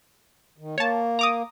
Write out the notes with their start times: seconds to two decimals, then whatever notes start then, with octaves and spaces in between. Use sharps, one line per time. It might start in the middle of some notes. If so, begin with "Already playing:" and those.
0.58 D#3
0.78 A#3 C#5 A5
1.19 A#5 D6 D#6